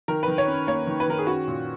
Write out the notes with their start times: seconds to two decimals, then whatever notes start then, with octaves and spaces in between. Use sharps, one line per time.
0.08 D#3 A#4
0.23 D#3 B4
0.38 C#5
0.48 C#4
0.67 A#3 C#5
0.87 D#3
1.00 B4
1.08 D#3 A#4
1.18 G#4
1.27 C#4 F#4
1.48 A#2